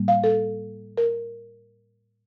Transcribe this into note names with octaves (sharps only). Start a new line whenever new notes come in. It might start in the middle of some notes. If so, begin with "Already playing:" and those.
Already playing: A2 G3 A#3
F5
A4
A#4